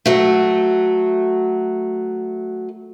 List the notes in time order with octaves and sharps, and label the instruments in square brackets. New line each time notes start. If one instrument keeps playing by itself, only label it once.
[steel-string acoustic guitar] F#3 A3